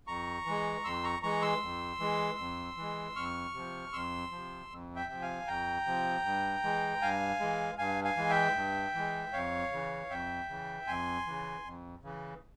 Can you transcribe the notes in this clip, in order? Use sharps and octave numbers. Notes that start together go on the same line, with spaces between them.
F2 A#5 C#6
E3 G#3
F2 C6 E6
A#5 C#6
E3 G#3 A#5 C#6
C6 E6
F2
E3 G#3
F2
E3 G#3
F2 C#6 F6
C3 F3
F2 C6 E6
C3 F3
F2
E5 G5
C3 F3
F5 G#5
F2 G5 A#5
C3 F3
G2
E3 G#3
G2 F5 G#5
E3 G#3
G2 F5 G#5
F5 G#5
E3 G#3
E5 G5
G2
E3 G#3
F2 C#5 F5
C#3 E3
F2 E5 G5
C#3 E3
F2 G#5 C6
C#3 E3
F2
C#3 E3